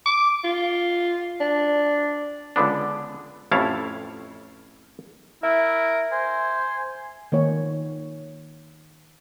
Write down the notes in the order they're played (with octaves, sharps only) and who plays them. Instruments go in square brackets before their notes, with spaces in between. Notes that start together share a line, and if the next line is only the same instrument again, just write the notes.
[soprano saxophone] D6
F4
D4
[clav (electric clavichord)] C#2 D3 B3 D4
A1 F2 E4 C#5 F5 A5
[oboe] E4 [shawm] A#4 [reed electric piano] E5
[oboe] C5 [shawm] G#5
[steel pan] D#3 A#3 C#5